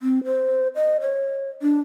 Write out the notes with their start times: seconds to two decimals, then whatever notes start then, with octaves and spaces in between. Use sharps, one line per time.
0.01 C4
0.25 C5
0.75 D#5
1.01 C#5
1.62 D4